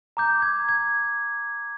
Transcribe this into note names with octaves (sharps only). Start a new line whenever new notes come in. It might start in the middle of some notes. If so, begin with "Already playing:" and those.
A#5 D6 G6
G#6
G#6